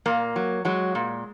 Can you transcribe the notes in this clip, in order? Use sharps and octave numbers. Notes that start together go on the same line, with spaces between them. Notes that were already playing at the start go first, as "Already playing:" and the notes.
A#2 A#3
F#3
F#3 G#3
A#2